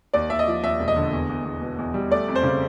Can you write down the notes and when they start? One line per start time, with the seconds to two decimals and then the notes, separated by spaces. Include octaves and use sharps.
0.14 D#2 D5
0.30 D#2 E5
0.39 D#5
0.48 F3
0.63 D#2 E5
0.79 E1
0.88 D#5
0.96 D3
1.13 E2
1.29 E2
1.45 E2
1.62 B2
1.79 E2
1.94 G3
2.11 A3 D5
2.28 F2
2.35 C5
2.43 C#3